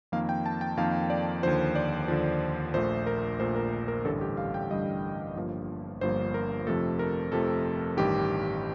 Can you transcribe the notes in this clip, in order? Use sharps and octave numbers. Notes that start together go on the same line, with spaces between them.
F2 D#3 A#3 F5
G5
A5
G5
F2 D#3 A#3 F5
D5
D#2 D3 F3 C5
D5
D#2 D3 F3
A#1 A#2 A3 C5
A#4
A#1 A#2 A3 C5
A#4
A#4
A1 G2 D3 G3 A4
G4
F5
G5
A1 G2 D3 G3 D#5
G1 G2 F3 A#3
G1 G2 F3 A#3 C5
A#4
F2 C3 F3 A3 A4
A#4
F2 C3 F3 A3 A4
A1 G2 D#3 G4